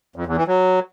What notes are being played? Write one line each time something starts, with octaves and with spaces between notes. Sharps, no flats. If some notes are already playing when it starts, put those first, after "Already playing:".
F2
E2
E3
F#3